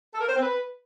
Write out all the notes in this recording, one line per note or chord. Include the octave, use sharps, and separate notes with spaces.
A4
A#4
C5
C4
B4